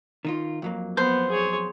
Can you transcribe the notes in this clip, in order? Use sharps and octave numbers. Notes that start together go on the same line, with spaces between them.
D#3 D#4 F4
F2 F#3 A#3
B3 C5
G#4 C#5